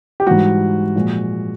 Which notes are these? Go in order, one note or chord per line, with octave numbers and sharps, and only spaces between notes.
G4
G#2 E3 G3 F#4
A#2 F3 G#3